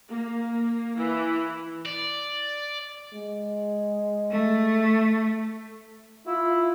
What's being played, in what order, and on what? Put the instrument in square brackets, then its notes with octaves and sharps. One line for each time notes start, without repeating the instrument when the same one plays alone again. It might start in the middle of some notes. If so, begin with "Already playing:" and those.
[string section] A#3
E3
[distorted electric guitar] D5
[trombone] G#3
[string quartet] A3
[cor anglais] E4 [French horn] F4